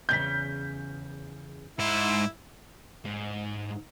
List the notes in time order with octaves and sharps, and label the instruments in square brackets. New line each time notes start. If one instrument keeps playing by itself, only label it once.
[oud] E2 C#3 [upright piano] G6 B6
[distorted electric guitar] G#2 C6 [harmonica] E4
[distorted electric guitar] G#2